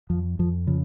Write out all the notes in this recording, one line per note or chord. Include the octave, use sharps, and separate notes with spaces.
F2 F3
F2 F3
C#3 F3